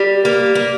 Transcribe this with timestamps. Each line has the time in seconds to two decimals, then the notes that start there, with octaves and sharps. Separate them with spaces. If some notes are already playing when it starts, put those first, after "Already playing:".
Already playing: G3
0.25 A#3
0.55 A#3